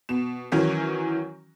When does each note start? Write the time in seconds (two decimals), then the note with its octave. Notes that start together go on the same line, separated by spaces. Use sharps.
0.09 B2 E7
0.52 D#3 E3 F#3 C#4